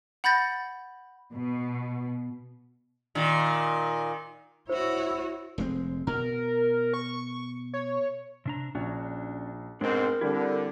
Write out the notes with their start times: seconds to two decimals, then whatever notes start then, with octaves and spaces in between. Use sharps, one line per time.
0.24 F#5 B5 G6 A6 A#6
1.33 B2
3.15 A#2 D#3
4.69 E4 F#4 C5 C#5
5.58 F1 G#3 C4
6.07 B2 A#4
6.94 C#6
7.74 C#5
8.46 C3 D4 A#5
8.75 A#1 C#4 D4 F#4
9.81 G#2 B2 G#3 C4 D4 A#4
10.21 D3 G3 C4 E4 G4